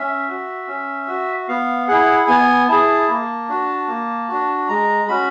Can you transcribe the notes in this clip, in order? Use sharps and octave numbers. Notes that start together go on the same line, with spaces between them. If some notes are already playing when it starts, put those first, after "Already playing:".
Already playing: C#4 E5
F#4
C#4
F#4
B3 F5
E4 G#4 F#5
B3 G#5
E4 G#4 A5
A#3
D4 F#4
A#3
D4 F#4
G#3 A#5
C#4 F#4 B5